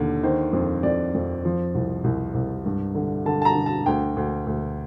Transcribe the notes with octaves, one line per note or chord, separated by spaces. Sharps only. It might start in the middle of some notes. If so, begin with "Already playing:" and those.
Already playing: D#2 D3
D#3 C5
F2
F2 D5
F2
F3
C2
C2
C2
G2
D3
D3 A5
A5
A#5
D3
A5
D2 G5
D2
D2